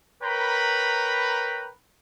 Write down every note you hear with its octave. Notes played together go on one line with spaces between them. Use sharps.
A#4 B4 C#5 G5 A#5 B5